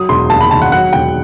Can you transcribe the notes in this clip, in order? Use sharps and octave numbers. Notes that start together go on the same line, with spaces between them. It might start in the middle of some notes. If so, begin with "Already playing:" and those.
Already playing: F#3 D#6
E1 C6
D#2 A5
B5
D#3 A5
F#5
F#3 F#5
E1 G5